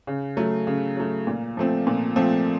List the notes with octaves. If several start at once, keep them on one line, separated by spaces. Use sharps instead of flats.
C#3
F#3 A3
C#3
F#3 A3
A#2
F3 A3 C4
A#2
F3 A3 C4